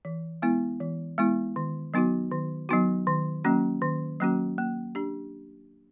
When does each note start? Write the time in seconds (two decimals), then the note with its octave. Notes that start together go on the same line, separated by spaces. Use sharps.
0.05 E3
0.42 G#3 B3 E4
0.80 E3
1.18 G#3 B3 E4
1.56 D#3
1.94 F#3 B3 D#4 F#4
2.31 D#3
2.69 F#3 B3 D#4 F#4
3.07 D#3
3.45 F#3 A#3 C#4 F#4
3.82 D#3
4.20 F#3 A#3 C#4 F#4
4.58 A#3
4.95 D4 G4